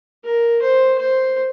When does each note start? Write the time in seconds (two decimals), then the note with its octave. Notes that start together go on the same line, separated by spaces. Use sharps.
0.24 A#4
0.62 C5
0.98 C5